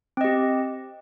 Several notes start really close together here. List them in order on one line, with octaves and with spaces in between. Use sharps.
C4 D#5 G4